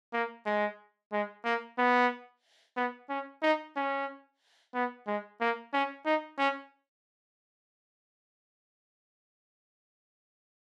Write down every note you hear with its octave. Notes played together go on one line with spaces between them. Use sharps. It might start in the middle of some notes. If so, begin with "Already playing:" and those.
A#3
G#3
G#3
A#3
B3
B3
C#4
D#4
C#4
B3
G#3
A#3
C#4
D#4
C#4